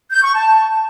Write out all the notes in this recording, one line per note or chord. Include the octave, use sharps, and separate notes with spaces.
G6
C#6
A5